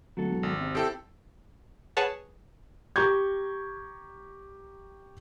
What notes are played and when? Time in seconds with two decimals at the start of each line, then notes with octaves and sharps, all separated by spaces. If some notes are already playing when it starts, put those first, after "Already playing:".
0.17 D1 F#3 F#4 A4
0.29 E1
0.43 G#1
0.61 C3
0.75 C4 E4 G4 A4 G5
1.97 G#4 B4 C#5 F#5 G#5 A5
2.96 G4 A#5 C#6 G6 G#6